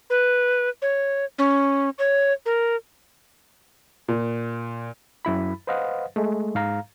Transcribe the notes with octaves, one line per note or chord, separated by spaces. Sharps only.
B4
C#5
C#4
C#5
A#4
A#2
F#2 E4 B5
B4 C5 D#5 F5 F#5
G#3 A3
G#2 F5 A#5